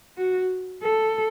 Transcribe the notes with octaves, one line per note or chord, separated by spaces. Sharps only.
F#4
A4